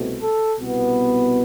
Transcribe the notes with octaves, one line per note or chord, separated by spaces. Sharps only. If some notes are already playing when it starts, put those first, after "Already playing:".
Already playing: C2 B2 A3 C4
A4
C2 B2 B3